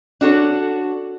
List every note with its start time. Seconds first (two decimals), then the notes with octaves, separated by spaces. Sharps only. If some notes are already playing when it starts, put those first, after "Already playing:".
0.21 D4 F#4 A4 C#5